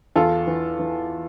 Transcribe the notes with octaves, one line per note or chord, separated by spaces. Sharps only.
E2 F4 A4
E3
E3